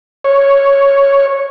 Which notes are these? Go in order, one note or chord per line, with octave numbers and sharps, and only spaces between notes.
C#5